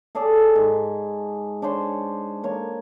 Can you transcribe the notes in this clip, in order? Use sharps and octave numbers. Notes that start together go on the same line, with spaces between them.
G#4 A4 C#5 D5
G#2 C#6
D4 C5 C#5 C6
A#3 C#5